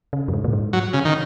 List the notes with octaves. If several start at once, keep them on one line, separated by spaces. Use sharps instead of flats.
C#3
F#2
G#2
A#2
G#2
F#3
C#3
D#3